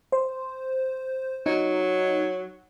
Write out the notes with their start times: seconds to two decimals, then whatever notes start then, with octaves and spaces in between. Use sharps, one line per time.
0.12 C5
1.46 F#3 D#4